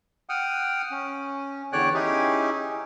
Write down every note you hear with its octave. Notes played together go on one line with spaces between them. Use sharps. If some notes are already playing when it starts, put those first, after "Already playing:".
F#5 G5 D#6 F6
C#4
E2 D3 C#5 D5 G5 F#6
C#4 D#4 E4 G4 G#4